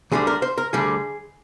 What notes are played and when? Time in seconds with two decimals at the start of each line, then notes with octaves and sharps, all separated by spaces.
0.12 D2 D3 G3 G#4
0.27 A#4
0.42 C5
0.58 A#4
0.73 D2 D3 G3 G#4